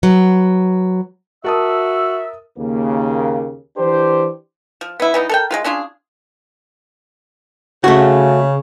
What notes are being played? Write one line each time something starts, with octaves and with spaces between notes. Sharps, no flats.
F#3 B4
F#4 A#4 E5 A5 D#6 E6
D#2 C#3 A#3
E3 D4 G4 C5
F3
B3 E4
E3 B3 D#4
A4 A#4 G5
G#3 B3 F4
C#4 D4 F4 G#4
C#3 A3 F#4